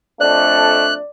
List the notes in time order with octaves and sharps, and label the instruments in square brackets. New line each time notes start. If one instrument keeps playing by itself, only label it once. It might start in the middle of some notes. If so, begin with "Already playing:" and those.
[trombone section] F2 A3 D4 [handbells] D5 [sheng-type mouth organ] F#6